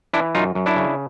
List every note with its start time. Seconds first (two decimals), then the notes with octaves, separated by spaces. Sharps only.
0.13 E3 D4 E4
0.35 F#2 D#4 F4
0.55 F#2
0.66 D4 E4
0.76 C#3